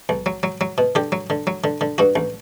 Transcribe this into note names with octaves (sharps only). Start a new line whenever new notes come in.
B1
F#3
F#3
F#3
B2
D3 G4
F#3
D3
F#3
D3
D3
G2 F#4
A1